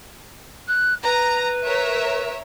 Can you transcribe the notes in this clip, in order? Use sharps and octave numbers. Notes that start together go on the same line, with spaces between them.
F#6
B4 A#5
A#4 C#5 E5